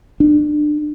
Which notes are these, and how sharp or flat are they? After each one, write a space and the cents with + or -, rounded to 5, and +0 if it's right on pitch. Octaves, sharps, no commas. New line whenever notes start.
D4 +25